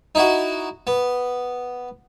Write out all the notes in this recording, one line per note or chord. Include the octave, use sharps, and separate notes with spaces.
D#4 E4 F#4
B3